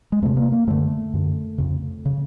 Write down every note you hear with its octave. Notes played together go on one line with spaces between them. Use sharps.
G#3
E2 C3 A3
A#3
A#3
F#2 D3 A3
F#2 D3
F2 C#3
C#3